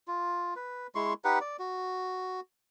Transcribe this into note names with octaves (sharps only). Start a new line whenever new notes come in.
F4
B4
G#3 E4 C6 C#6
D#4 G4 B4 F#5
D5
F#4